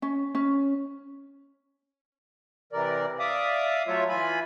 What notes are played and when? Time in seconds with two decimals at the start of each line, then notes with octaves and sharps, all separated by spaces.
0.02 C#4
0.35 C#4
2.73 C3 E3 A#4 D5
3.19 D5 E5 F5 D6 D#6
3.87 F#3 A3 F4 C#5 E5
4.09 E3 F4 G#5 B5